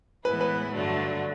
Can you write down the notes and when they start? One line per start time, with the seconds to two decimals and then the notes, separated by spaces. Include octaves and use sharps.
0.25 A2 E3 G#3 B3 E4 B4
0.41 B4
0.73 G2 D3 F#3 A3 D4